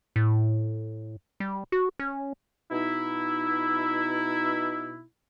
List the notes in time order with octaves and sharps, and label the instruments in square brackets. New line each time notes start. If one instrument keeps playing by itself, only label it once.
[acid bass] A2
G3
F#4
C#4
[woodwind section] B2 D#4 E4